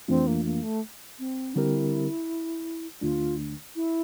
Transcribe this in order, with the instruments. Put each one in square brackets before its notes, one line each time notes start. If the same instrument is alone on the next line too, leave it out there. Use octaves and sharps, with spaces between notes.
[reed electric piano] F2 E3 A3 D4 F4 [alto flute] C4
[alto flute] A#3
A#3
A3
C4
[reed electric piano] D3 G3 C4 G4 A#4 [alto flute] E4
[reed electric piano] D2 D3 A3 D4 [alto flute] F4
[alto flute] E4